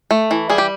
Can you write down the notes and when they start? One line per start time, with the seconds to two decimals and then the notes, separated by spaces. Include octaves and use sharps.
0.11 A3
0.31 E3
0.50 G3 G#4
0.58 G4